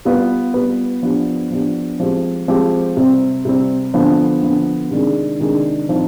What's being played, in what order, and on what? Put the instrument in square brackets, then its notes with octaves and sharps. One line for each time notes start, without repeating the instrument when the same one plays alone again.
[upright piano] G3 B3 F4 B4
G3 B3 F4 B4
F3 B3 D4 G4
F3 B3 D4 G4
F3 G#3 C4 G4
F3 G#3 C4 G4
C3 G3 C4
C3 G3 C4
D3 F3 B3
D3 F3 B3
C3 D#3 G#3 D4 G#4
C3 D#3 G#3 D4 G#4
F3 C4 D#4